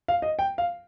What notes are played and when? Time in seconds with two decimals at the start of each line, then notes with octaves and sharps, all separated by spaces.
0.08 F5
0.22 D#5
0.39 G5
0.58 F5